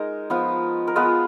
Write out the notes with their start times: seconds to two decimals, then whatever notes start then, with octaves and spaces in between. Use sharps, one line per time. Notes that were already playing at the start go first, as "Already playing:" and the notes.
Already playing: G#3 D#4 A#4
0.30 F3 B3 F4
0.87 A#4
0.96 G#3 B3 F4 B4